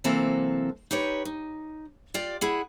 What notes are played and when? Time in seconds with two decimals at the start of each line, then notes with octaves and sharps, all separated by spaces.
0.04 C3 E3 F#3 A#3 C4 A4
0.91 D#4 G4 B4 C#5
1.25 D#4
2.14 F4 G4 D5
2.41 E4 G#4 F#5